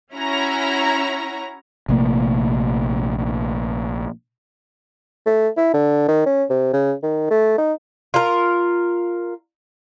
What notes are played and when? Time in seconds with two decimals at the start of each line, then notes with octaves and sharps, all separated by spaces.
0.14 C#4 E4 F#4 A#5
1.89 A#1 C3 A3 A#3
5.26 A3
5.57 E4
5.74 D3
6.08 D#3
6.26 C#4
6.50 C3
6.73 C#3
7.03 D#3
7.31 A3
7.58 D#4
8.14 F4 A#4